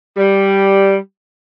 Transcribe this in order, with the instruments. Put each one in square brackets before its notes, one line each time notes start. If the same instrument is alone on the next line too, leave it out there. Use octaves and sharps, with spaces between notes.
[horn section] G3